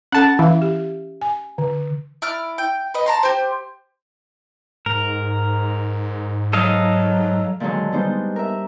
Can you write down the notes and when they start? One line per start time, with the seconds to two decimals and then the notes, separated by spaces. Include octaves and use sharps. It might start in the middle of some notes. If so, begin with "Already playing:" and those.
0.12 C#4 A4 F#5 A5
0.39 E3 E5 F5
0.62 G4
1.22 G#5
1.58 D3
2.22 E4 D5 F6
2.58 G5
2.94 B4 D#5
3.06 A5 A#5 C6
3.23 G4 C5
4.86 G#2 A#4
6.53 F#3 A4 D#5 F5
7.60 A#2 D3 D#3 F#3 G#3
7.92 G3 G#3 B3 D4 D#4 C5
8.36 A#4 E5